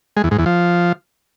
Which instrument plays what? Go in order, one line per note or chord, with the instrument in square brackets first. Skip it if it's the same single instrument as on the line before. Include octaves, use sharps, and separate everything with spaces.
[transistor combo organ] G#3
E2
G#2
E2
F3